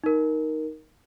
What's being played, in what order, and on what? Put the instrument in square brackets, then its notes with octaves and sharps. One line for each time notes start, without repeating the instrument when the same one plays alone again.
[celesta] D#4 A#4